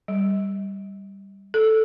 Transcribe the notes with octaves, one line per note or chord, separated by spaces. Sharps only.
G3
A4